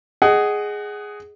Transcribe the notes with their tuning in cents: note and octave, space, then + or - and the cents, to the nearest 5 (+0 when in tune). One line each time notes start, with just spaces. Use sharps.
G#4 +0 D#5 -15 F#5 +25